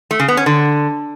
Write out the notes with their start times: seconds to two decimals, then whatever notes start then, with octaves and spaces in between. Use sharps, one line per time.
0.11 A3
0.20 C#3
0.28 B3
0.37 C#4
0.46 D3